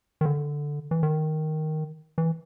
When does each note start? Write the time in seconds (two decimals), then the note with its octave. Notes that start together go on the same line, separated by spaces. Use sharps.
0.21 D#3
0.25 D3
0.91 E3
1.03 D#3
2.18 E3